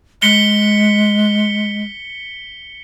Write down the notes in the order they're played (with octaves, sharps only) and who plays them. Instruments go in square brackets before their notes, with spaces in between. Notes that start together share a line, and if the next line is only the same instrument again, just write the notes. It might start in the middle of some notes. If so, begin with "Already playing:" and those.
[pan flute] G#3 [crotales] B6 C#7 G7